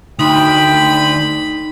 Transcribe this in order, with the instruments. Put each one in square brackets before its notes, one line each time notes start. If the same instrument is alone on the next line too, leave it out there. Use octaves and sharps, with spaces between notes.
[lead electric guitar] D2 [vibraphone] D#4 [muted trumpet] G5 [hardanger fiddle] B5